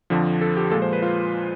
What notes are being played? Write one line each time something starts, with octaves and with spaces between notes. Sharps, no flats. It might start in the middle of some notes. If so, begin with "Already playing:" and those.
F2 D3 F3
A4
G4
A#2 F3 G#3 A4
C5
B4
F4